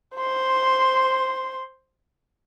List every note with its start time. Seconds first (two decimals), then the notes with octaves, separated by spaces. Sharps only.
0.17 C5 C6